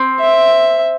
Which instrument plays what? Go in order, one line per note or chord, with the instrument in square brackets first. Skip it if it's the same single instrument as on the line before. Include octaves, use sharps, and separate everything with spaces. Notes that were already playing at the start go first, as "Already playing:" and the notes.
Already playing: [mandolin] C4
[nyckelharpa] E5